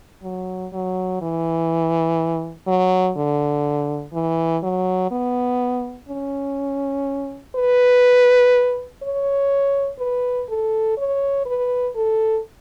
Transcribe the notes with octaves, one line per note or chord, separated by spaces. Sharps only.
F#3
F#3
E3
F#3
D3
E3
F#3
B3
C#4
B4
C#5
B4
A4
C#5
B4
A4